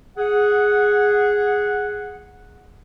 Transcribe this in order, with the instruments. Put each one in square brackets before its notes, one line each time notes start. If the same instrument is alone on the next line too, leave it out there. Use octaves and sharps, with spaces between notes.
[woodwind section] G#4 F#5